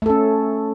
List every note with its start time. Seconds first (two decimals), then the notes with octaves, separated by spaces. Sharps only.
0.02 A3
0.06 A4
0.10 C#4